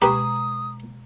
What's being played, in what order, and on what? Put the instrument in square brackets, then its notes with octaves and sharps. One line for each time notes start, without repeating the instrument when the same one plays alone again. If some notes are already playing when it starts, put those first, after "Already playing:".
[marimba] B2 G#3 C#6 [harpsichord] G4 B4 [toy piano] A#5 [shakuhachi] D#6